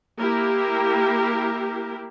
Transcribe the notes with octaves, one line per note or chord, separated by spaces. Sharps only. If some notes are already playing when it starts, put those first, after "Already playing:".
A#3 E4 G4 A#4